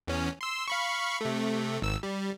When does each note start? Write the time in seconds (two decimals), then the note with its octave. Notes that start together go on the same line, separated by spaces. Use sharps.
0.07 E2 C#4
0.41 C6 E6
0.68 F5 B5 C#6
1.21 C3 A3
1.82 G#1 E6
2.03 G3